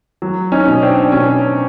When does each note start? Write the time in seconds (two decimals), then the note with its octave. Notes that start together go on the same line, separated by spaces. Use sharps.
0.22 F#3
0.52 C#4 D#4
0.67 B2
0.82 C4 D4
1.12 B2 C#4